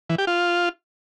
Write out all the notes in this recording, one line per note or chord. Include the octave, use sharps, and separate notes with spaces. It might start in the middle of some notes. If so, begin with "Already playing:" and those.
E3
G4
F4